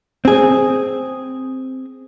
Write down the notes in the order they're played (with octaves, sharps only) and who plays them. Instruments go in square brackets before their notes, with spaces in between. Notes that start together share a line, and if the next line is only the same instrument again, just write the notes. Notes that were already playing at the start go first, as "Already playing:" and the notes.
[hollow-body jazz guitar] C4 G#4